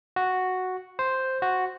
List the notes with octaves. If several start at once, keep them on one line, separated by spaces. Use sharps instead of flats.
F#4
C5
F#4